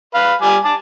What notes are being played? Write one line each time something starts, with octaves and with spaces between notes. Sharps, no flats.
B4 F5
G3 G#5 D6
A5 D6